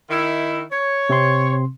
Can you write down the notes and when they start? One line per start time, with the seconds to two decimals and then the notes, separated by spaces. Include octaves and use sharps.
0.10 D#3 E4
0.72 C#5
1.09 C3 C4 C6